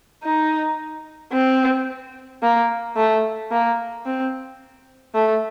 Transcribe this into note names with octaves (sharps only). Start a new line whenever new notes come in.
D#4
C4
A#3
A3
A#3
C4
A3